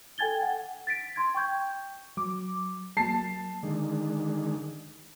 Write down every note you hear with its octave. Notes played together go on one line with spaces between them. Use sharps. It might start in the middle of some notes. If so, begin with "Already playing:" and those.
A4 G5 G#5 G#6 A6 G7
F#5 G#5
A6 B6 D7
C6 G#6
G5 C#6 G6 G#6
F#3 D6
F#3 A#3 A5 C7
D3 D#3 G#3